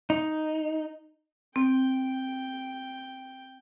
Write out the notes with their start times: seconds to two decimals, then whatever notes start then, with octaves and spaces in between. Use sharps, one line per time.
0.10 D#4
1.56 C4 G5